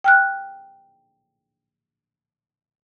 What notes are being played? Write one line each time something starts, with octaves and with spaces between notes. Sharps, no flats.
G5 F6 F#6